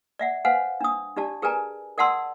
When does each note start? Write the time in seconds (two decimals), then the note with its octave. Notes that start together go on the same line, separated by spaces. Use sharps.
0.19 D5 E5 F#5
0.45 B4 C5 F5 F#5 G#5
0.81 D4 D#6
1.16 D4 G4 D5 A5
1.42 G#4 A#4 B4 D5 G#5 A#5
1.98 A#4 D5 F#5 A5 C6 E6